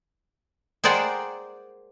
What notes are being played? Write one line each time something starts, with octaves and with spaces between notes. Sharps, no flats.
G#4 A#4 C5 D5 F#5 G5